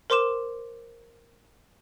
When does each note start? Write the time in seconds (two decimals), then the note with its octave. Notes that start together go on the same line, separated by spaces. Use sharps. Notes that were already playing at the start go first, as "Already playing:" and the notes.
0.10 A#4 C5 C6 D6 E7